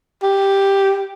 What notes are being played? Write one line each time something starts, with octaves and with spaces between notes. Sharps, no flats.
G4